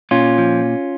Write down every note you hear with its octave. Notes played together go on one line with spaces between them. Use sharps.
A#2 C#4 F4
F3